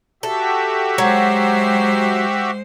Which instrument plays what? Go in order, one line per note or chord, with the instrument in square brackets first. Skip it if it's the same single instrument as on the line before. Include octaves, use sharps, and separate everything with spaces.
[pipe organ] F#4 G4 E5 [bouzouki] A4
[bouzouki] F#3 [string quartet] G#3 C5